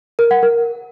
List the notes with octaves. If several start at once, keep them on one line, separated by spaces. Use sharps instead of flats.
A#4
F#5
A#4